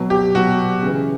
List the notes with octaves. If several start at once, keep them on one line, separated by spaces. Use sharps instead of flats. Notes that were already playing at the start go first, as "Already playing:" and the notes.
Already playing: B2 F#3
G4
B2 F#3 F#4
C#3 E3